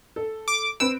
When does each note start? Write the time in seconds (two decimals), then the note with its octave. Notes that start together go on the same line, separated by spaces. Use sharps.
0.16 A4
0.48 D6
0.80 C4 B4 E6 D7